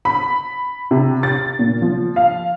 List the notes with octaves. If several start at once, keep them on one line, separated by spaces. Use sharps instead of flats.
B5
C3
A6
A#2
F3
F5